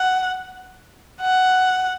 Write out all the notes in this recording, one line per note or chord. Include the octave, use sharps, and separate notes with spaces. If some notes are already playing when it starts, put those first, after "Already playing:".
Already playing: F#5
F#5